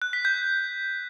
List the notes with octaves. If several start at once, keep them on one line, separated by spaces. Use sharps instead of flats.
F#6
B6
G6